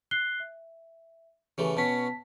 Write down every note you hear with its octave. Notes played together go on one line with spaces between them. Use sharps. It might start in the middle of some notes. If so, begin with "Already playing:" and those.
F#6 C7 G7
E5
C#3 E3 A3 G4
B2 C#4 A5 B6